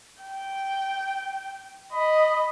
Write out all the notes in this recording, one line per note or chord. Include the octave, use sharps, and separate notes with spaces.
G5
D#5 B5